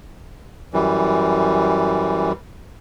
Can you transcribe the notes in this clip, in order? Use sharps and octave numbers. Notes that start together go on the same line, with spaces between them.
F#2 E3 G3